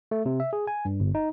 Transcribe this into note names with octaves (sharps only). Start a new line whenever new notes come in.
A3
C3
E5
G#4
G#5
G2
G1
D#4